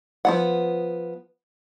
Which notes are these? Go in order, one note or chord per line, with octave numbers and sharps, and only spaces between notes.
F3 B3 F#5